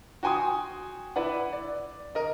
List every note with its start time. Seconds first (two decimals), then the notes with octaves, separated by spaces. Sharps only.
0.23 F#4 G5 G#5 C6 D#6
1.16 E4 B4 D5 F#5
1.53 D5
2.15 A#4 D#5